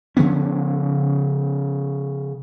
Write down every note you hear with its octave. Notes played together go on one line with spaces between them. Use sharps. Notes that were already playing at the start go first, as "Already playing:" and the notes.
C#3 F3 B3 C#4